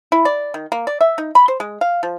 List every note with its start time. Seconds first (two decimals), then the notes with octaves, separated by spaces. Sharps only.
0.12 E4
0.25 D5
0.54 D#3
0.72 A#3
0.87 D5
1.01 E5
1.18 D#4
1.35 B5
1.48 C5
1.60 G#3
1.81 F5
2.03 F3